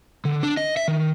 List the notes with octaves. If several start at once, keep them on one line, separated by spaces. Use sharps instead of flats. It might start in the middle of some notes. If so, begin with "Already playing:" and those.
D3
D4
D#5
E5
D#3